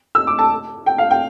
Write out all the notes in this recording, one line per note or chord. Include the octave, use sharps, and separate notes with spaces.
E6
D6
A5
G5
F5
G5